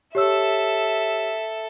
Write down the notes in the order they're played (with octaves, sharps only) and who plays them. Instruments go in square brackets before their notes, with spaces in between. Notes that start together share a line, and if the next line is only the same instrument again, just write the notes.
[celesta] G4 C#5 E6 [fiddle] A4 E5